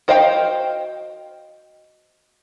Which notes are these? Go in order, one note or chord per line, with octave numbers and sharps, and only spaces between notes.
F#4 C5 D#5 F5 G5